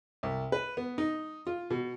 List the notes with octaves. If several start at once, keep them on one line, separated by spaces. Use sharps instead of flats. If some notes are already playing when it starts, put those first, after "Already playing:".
C2
B4
B3
D#4
F4
B2